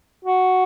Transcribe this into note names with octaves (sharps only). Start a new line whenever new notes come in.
F#4